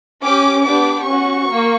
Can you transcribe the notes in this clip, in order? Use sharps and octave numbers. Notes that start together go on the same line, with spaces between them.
C#4 G4 D6
B3 D4 G4 D6
C#4 F#4 C#6
A#3